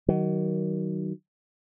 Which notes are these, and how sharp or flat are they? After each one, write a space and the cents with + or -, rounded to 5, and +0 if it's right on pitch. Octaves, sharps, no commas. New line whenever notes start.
D#3 +10 F#3 +30